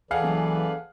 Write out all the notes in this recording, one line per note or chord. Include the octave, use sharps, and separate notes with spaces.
E3 G#4 A4 B4 D5 F5 F#5
F#1